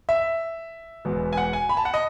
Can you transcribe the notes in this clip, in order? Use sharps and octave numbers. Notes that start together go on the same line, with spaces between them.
E5
E1 E2 B2 G#3 B3
G#5
F#5
G#5
B5
A5
F#5
D#5